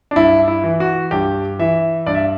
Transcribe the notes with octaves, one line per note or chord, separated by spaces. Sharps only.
D4
G2 E4
E4
E3
F#4
G2 G4
E3 E5
G2 D5
E5